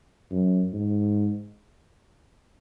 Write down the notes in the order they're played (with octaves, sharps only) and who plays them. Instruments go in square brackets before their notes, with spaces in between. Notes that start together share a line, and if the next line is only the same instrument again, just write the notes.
[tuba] F#2
G#2